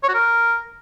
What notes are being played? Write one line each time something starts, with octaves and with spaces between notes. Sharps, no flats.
C#5
F#4
A#4